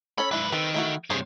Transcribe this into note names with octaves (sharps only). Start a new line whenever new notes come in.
C#4 A4 C#5 B5
G#2 D4 E4 B4
D#3 C4 A4 B4
A3 E4 F#4
G2 C3 G#4 C5 C#5